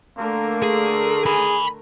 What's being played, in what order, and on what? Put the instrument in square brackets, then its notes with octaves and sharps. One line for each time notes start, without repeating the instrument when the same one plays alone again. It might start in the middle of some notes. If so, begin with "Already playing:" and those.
[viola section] D3 A3 A#4 [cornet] A#3
[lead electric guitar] G#4
[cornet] G#4 [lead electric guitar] G#5 B5